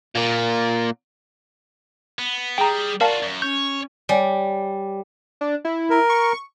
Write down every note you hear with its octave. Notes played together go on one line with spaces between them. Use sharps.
A#2 A#3
B3
G3 G#4 G5 A#5
F4 F#4 A#4 D5 F5 A5
F#2
C#4 C#5 G6
G3 C#5 D5 G#5
D4
E4
A#4
C#6